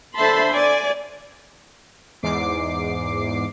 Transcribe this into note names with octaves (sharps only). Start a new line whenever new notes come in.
D3 C5 E5 A5 B5 C6
D5 G#5
E2 G#2 D6 C7